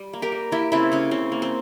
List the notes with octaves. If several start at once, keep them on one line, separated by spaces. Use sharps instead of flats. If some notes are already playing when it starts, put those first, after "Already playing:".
Already playing: G3
A#3
G4 A#4
G3
A#3 E4 G4
C#3 C4 E4
C#3 C#4
C#3 C4
A#3
C4